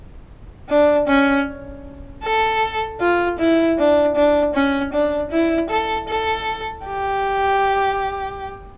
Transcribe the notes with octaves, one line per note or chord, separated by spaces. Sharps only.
D4
C#4
A4
F4
E4
D4
D4
C#4
D4
E4
A4
A4
G4